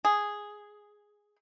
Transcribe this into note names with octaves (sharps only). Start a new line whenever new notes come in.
G#4